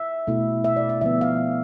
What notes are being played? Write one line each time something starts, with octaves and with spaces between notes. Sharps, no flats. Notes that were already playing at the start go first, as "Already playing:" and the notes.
Already playing: E5
B2 A3 E4
E5
D5
E5
D3 F3 B3 E5
F5